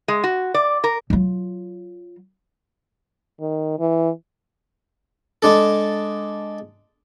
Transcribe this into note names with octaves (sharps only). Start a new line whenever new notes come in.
G#3
F#4
D5
A#4
F#3 F4
D#3
E3
G#3 D4 A4